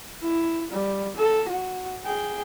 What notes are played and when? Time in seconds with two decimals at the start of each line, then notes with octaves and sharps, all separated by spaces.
0.22 E4
0.71 G3
1.17 A4
1.48 F#4
2.04 G#4 G5